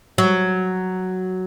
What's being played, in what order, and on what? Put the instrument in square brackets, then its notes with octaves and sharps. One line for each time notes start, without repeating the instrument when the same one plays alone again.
[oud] F#3